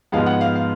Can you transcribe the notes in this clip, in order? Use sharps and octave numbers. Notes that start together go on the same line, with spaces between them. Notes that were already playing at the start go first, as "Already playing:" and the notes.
G#2 F3 G#3 B3 F5
F#5
F5
F5